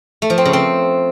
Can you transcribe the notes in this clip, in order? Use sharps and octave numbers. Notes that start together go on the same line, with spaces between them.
A3
F3
C4
C#3
C4